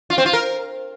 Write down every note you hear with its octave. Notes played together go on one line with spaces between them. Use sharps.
F4
C4
F4
A#4